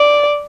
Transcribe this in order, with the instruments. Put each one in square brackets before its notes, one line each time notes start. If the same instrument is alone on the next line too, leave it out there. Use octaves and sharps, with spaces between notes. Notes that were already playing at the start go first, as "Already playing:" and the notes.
Already playing: [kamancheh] D5